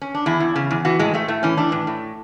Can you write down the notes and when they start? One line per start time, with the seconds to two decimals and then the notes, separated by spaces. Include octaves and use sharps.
0.02 C#4
0.15 D4
0.26 E2 E4
0.40 E2
0.56 C#3
0.71 E2
0.85 E3 F#4
0.99 A2 G#3
1.14 A2 A3
1.28 A2 A3
1.43 E3 C#4
1.57 E3 D4
1.72 A2
1.87 A2